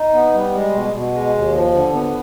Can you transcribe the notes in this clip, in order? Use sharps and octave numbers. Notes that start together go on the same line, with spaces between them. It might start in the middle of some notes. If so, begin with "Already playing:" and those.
Already playing: D#4
B3
G3
G#3
B2
B2
G#3
D#2
F3
D3
B3